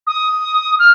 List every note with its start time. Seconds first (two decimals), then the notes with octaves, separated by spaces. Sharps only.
0.07 D#6
0.79 F6